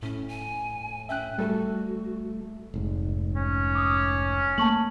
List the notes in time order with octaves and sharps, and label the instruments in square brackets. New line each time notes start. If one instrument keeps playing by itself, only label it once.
[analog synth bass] A2 [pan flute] C#4
[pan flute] G#5
[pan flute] C#4 [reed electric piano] E5 G5 F#6
[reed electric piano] G3 A4 [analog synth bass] A3 [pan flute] F#4
[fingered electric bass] F1 G#2
[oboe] C#4
[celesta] D6 D#6
[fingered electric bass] A3 A#3 [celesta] A5 C#6 F#7